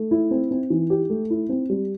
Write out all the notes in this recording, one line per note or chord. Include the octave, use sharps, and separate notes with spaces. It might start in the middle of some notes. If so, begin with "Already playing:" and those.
Already playing: A3
E4
C4
C4
E3
G4
A3
E4
C4
G3